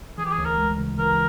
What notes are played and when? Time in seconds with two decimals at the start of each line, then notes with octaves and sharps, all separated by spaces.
0.18 E3 G#4
0.25 G4
0.32 G#4
0.38 D2
0.45 A#4
0.58 G#3
0.78 C#3
0.98 E3 A#4